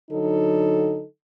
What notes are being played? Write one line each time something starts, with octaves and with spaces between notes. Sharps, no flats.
D3 F#3 D#4 A4